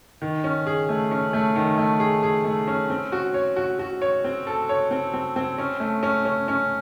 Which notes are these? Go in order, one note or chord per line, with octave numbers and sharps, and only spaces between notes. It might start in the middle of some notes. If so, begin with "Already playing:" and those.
D#3
C#4
G#4
A3
C#4
A3
D#3
A3
G#4
G#4
A3
C#4
C4
F#4
C#5
F#4
F#4
C#5
C4
A4
C#5
C4
C4
C4
C#4
A3
C#4
C#4
C#4